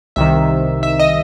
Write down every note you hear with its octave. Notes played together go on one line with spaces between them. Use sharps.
C2 C3 D#3 E5
E5
D#5